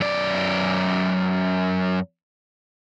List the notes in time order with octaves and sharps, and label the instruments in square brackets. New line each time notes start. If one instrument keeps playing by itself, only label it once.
[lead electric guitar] F#2 D5